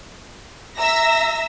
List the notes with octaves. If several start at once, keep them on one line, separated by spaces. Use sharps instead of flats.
E5 A#5 E6 A#6